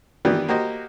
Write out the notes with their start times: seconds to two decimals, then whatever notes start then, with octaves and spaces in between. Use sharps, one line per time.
0.25 D#3 E3 B3 D4 G4 B4
0.48 A#3 F#4 G4 C5 D#5